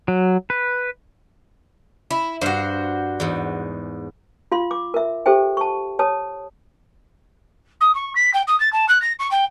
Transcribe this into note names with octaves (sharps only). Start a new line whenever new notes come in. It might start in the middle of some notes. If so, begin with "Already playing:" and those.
F#3
B4
E4
G2 F#4 C5 F5
E2 G#2
F4 F5 C6
D6
A#4 E5
G4 A4 C5 E5 G5
A5 C#6
C#5 A5 D#6
D#6
C#6
B6
G5
D#6
A6
A5
F#6
A#6
C#6
G5